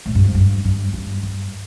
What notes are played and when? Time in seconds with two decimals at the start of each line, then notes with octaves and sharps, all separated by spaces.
0.06 A2
0.15 G2
0.24 F2
0.34 G2
0.65 G2
0.93 G2
1.23 G2